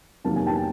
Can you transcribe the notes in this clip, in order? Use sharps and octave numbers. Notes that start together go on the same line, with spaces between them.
F2 C3 D#3 F#3 A#3 A5
G#5
G5 A5